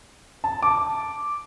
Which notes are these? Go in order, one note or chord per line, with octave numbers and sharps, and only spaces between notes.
A5
D6